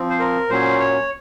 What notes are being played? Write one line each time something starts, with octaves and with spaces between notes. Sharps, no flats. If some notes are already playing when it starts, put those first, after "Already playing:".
Already playing: F3 C4
C5
A#4
A#2 F#3 C#4 C5
C#5